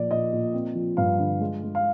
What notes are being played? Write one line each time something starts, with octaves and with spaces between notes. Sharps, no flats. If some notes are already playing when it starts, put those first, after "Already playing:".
Already playing: A#2 F3 D5
A#2 D#5
A#2
C4
F3
G2 F5
D3
G#3
G#3
F5